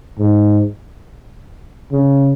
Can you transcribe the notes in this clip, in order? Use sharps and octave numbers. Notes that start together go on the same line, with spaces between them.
G#2
C#3